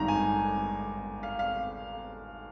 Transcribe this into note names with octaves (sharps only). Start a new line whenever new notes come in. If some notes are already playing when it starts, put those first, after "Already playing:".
Already playing: G#1 G2 D#3 A#5
G#5
F5
F5